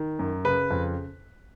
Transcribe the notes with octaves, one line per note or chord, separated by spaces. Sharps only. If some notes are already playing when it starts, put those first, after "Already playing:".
Already playing: D#3
F#2
C#3 B4
F2